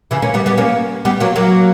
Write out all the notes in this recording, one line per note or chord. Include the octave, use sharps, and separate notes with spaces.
C#3 E3
A#3 C#4
G3 B3
G3 B3
A#3 C#4
G3 B3
F#3 A#3
F#3 A#3